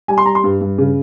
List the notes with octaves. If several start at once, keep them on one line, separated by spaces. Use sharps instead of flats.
G3 G#5
C6
G3 A#5
C6
G2
G2
C#3